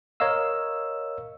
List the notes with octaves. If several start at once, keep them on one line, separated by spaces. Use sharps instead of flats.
A#4 C#5 D#5 F5 E6